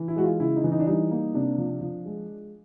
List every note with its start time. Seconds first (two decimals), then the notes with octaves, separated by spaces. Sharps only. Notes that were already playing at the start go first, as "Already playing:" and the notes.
Already playing: E3
0.08 E4
0.16 G#3 F#4
0.24 F4
0.40 C#3 E4
0.56 D#4
0.64 E3
0.72 D#4
0.80 D4
0.87 G3 D#4
1.11 A#3
1.34 C3 D4
1.58 F3
1.81 F3
2.05 G#3